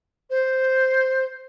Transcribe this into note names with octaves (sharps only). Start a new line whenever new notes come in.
C5